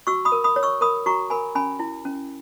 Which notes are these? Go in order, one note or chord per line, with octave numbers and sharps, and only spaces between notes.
F#4 C#6 E6
B5 D#6
A#4
B5 D#6
C#5
C#6 E6
A#4 B5 D#6
F#4 A#5 C#6
A#4 G#5 B5
C#4 G#5 B5
E4
C#4